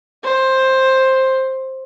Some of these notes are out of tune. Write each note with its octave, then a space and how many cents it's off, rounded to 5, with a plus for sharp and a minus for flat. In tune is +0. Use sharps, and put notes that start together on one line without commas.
C5 +10